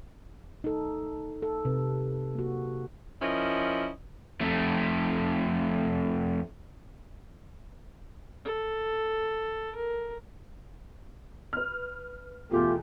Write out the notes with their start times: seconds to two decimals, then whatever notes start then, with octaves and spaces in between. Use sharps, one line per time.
0.64 D#4 A4
1.42 A4
1.65 C3 B4
2.35 A#3 F#4
3.22 F3 C#4 E4 A#4 D#5
4.41 F2 A3
8.45 A4
9.75 A#4
11.53 B4 F6
12.51 E2 B2 A3 F4 G4